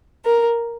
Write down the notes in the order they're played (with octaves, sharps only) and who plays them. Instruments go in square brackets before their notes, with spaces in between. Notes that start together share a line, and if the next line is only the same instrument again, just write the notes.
[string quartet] A#4